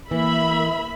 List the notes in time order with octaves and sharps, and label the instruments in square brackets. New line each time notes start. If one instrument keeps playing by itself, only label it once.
[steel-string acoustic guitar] E3 [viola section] A#3 E5 B5